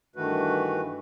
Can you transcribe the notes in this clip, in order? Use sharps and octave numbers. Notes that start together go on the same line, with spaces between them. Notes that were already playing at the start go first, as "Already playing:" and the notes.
G2 D#3 E3 A3 F#4 B4